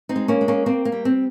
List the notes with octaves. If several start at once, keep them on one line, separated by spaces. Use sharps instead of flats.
C4 D#4
G#3
A#3 C#4
G#3
A#3 C#4
A#3 C4
A#3
G3
C4